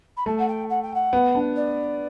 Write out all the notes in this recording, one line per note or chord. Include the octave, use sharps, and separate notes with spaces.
B5
A3 A5
F#5
G5
F#5
G5
F#5
B3
D4
D5